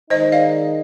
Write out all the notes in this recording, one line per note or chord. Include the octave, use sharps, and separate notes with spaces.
D#3 G#3 D#4 C5 D#5
D5 F5